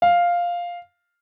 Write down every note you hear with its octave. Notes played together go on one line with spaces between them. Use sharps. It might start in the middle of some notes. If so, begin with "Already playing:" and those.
F5